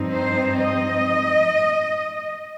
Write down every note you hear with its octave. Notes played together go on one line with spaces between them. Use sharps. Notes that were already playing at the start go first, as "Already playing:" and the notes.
Already playing: G2 F3 C4 D#4
C5
D#5